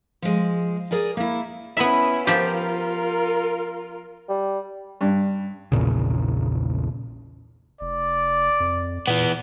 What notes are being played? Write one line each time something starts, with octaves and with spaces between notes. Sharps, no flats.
F3 G#3
G#4 A#4 D5 G#5
A#3 E4
B3 C#4 E4 E5
F3 F4 G4 A#4
G3
G2
A#1 E2 A#2 C#3
F1 D5
F2
A#2 E3 B3